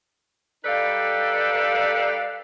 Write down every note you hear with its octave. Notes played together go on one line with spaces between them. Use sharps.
G3 D#4 A4 B4 D5 F5